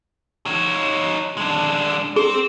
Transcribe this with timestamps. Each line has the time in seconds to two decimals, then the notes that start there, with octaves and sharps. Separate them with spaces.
0.46 D#4 C#5
1.37 G#3 D4
2.16 C4 G#4